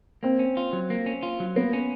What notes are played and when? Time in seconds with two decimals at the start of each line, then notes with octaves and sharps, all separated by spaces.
0.23 A#3 C4
0.39 C#4
0.57 F4
0.73 F#3
0.90 A#3
1.06 C#4
1.23 F4
1.40 F#3
1.56 A#3 B3
1.73 C#4